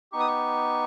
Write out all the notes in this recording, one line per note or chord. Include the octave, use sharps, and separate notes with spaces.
B3 D#4 G4 C#6
D#6
C#6